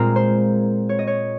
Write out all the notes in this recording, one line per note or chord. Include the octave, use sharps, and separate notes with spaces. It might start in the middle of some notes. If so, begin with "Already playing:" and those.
Already playing: A#2 G#3 C4 A#4
C5
C#5
D#5
C#5